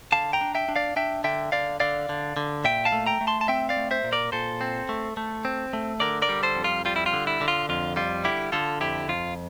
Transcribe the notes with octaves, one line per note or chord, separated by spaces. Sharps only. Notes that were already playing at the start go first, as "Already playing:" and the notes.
D3 F5 A5
G5 A#5
D4
E5 G5
D4
D5 F5
D4 E5 G5
D3 E5 G5
D3 D5 F5
D3 D5 F5
D3
D3
A#2 E5 G5
F5 A5
A3
G5 A#5
A3
A5 C6
A5
C4 E5 G5
D5 F5
A3
C5 E5
A#2
A#4 D5
A#2 A4 C5
C4
A3
A3
C4
A3
D3 A#4 D5
A#4 D5
G3
A4 C5
F2
F4
G3 F4
E4
F4
D3
E4
D3
F4
F2 F4
G3 F4
D3 E4 G4
D3 F4 A4
F2 E4 G4
F2 F4